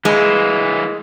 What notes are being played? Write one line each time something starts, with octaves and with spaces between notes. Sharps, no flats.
E3 G#3 A#3 E4